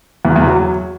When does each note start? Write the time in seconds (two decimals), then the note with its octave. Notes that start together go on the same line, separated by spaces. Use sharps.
0.25 E2
0.36 E2
0.47 F#3